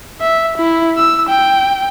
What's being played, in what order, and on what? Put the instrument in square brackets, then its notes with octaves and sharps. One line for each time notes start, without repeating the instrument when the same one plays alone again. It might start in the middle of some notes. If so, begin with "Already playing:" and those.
[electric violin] E5
E4
E6
G5